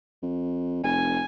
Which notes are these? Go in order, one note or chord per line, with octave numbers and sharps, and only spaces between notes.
F2
F1 G#5